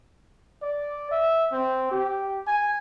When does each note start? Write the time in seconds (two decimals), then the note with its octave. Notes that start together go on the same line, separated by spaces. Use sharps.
0.62 D5
1.11 E5
1.52 C4
1.91 G4
2.47 G#5